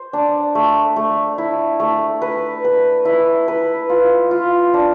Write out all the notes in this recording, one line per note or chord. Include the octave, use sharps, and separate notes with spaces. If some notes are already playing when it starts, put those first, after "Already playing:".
Already playing: C5
D4
A3
A3
E4
A3
B4
B4
E4
B4
F4
F4
D4